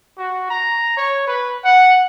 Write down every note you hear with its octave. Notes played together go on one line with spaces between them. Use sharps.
F#4
A#5
C#5
B4
F#5